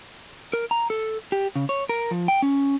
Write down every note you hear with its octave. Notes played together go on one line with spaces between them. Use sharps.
A#4
A#5
A4
G4
C#3
C#5
A#4
F3
G5
C#4